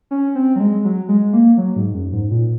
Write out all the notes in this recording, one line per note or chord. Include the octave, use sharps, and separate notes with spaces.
C#4
C4
F#3
G#3
F#3
G#3
A#3
F#3
G#2
F#2
G#2
A#2